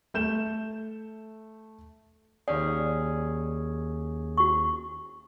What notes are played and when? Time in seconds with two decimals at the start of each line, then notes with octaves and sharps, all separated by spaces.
0.14 A3 G6 E7
2.48 D#2 C#4 G#4 D5
4.38 F#4 C#6